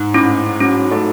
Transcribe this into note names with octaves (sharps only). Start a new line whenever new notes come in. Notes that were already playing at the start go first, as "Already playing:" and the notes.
Already playing: G#2
A2 C#4
F#3 C#4
A3